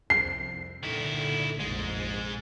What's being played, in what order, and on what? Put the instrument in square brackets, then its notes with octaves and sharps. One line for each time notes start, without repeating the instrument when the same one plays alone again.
[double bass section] C2 F2 [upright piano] C7
[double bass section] A#2 D3 [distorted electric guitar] D#3 E4
[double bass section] F1 A#1 [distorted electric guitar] G#2 G#3